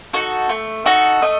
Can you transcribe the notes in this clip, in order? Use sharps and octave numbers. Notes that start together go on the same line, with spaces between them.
D#4 F#4 A4
A3
D#4 F#4 A4
A3 D#5